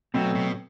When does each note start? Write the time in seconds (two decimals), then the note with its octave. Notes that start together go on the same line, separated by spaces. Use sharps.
0.14 B2 F#3 A3 C4
0.35 B2